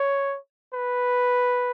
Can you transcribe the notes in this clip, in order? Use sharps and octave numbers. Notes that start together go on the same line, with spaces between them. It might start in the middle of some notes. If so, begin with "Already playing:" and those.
Already playing: C#5
B4